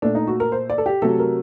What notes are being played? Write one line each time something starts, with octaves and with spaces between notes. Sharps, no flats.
A#2 A3 D4
D#4
F#4
A#4
C5
D5
A4
G4
C3 F#3 A3 A4
A#4